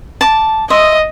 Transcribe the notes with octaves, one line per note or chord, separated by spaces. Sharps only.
A5 D6
D#5 E5 C6 D#6